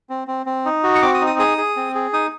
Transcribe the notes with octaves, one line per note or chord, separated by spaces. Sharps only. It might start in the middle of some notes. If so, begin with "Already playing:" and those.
C4
C4
C4
D#4
F#4
C#6
C4 D6
D#6
D#4
D#6
G#4 D#6
G#4
C4
G#4
D#4 D#6